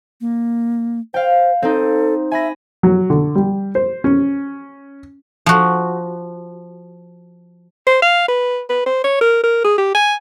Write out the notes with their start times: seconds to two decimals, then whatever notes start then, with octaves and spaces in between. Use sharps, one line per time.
0.21 A#3
1.14 C5 F5 G5
1.62 C4 D#4 A4
2.32 E5 G#5 B5 A#6
2.83 F#3
3.10 D3
3.35 G3
3.75 C5
4.04 C#4
5.46 F3 F#4
7.87 C5
8.02 F5
8.28 B4
8.70 B4
8.86 C5
9.04 C#5
9.21 A#4
9.43 A#4
9.64 G#4
9.78 G4
9.95 G#5